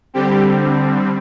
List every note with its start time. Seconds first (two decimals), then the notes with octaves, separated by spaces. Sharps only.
0.14 D3 G3 C4 G4